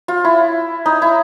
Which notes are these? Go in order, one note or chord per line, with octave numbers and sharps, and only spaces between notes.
F4
E4
D#4
E4